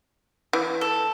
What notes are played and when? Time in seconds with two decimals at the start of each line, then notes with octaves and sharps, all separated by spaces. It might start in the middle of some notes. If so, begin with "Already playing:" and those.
0.53 E3
0.81 A4